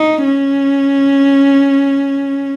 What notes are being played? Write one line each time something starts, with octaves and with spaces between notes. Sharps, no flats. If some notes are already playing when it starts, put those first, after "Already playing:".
Already playing: D#4
C#4